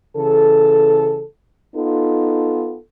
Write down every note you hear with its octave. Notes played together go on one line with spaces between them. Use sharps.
C#3 E3 A4
B3 D#4 F4 A4